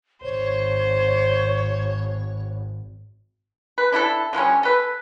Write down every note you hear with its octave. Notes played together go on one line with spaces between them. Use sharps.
G#1 C5 C#5
B4
D4 E4 F#4 A4
D3 F3 G3 C#4
A4 B4